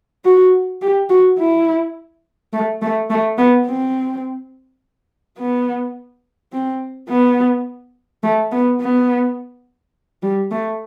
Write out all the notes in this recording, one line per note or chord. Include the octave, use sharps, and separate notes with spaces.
F#4
G4
F#4
E4
A3
A3
A3
B3
C4
B3
C4
B3
A3
B3
B3
G3
A3